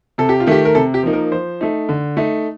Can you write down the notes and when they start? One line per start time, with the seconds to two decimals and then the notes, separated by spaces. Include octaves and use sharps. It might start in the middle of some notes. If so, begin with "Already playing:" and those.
0.18 C3 A4
0.29 G4
0.40 F4
0.47 D#3 A3 G4
0.65 A#4
0.75 C3 A4
0.94 G4
1.03 F3 A#3 D#4
1.13 A#4
1.32 F3 C5
1.61 A3 D#4
1.89 D3
2.17 A3 D#4